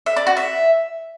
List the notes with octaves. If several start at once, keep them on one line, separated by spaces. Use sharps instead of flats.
E5
D5
F#4
E5